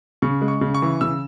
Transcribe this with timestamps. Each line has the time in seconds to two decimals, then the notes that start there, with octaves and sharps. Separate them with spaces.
0.22 C#3 C#6
0.41 G#3
0.48 C#6
0.61 C#3
0.74 C#6
0.82 E3
1.01 C#3 E6